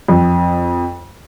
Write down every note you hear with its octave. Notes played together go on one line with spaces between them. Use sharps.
F2